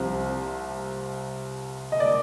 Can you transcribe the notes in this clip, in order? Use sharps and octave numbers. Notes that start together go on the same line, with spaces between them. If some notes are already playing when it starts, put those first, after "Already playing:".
Already playing: C2 C3 F3
D#5
D5